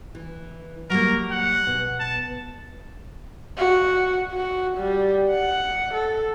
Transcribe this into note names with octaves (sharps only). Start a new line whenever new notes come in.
E3
F#3 G3 A#3 A#4
F#5
B2
A5
F#4
F#4
G3
F#5
A4